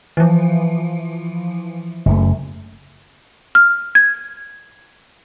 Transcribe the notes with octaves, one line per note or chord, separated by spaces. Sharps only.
E3 F3
F#1 F#2 A3
F6
G#6